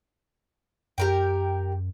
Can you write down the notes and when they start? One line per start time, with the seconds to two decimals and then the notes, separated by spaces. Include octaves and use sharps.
0.98 F#2 G4 A#4 G5